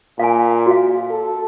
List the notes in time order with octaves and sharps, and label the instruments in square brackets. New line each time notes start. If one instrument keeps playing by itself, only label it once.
[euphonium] A#2 [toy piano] F5 G#5
[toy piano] F#4 F5
[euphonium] A4